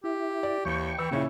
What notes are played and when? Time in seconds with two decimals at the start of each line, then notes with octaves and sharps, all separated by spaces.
0.04 E4 G4
0.43 D5
0.65 D#2 E3 G5 C#6
0.98 E3 E6
1.11 A#2 C#3 C#4 E4